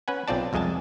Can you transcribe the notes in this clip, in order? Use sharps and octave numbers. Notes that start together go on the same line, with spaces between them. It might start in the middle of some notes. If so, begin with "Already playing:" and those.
C#4 B4 F#5 G#5
B1 C4 F4 D5 A5
C2 F2 G#3 D#5 G#5 A5